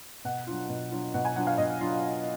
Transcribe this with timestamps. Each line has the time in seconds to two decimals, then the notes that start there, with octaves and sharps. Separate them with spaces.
0.24 B2 F#5
0.47 F#3 D4 F4
0.69 B2
0.91 F#3 D4 F4
1.14 B2 F#5
1.25 G#5
1.36 F#3 D4 F4 F#5
1.47 F5
1.58 B2 D#5
1.81 F#3 D4 F4